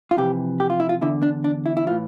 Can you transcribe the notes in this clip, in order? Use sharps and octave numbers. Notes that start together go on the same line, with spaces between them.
F4
F2 C3 E3 G4
G4
F4
E4
F4
E2 D3 E4
D4
D4
E4
E4
A2 E3 F4